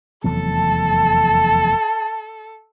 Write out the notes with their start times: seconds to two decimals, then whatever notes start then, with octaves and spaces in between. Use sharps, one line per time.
0.24 F1 E2 F#3 A4 A5